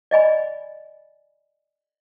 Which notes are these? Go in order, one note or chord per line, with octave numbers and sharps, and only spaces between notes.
D5 D#5 G#5 B5